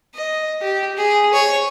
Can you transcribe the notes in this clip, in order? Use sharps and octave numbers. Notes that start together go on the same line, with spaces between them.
D#5
G4
G#4
C#5